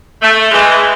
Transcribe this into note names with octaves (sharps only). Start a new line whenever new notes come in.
A3
E3 G#3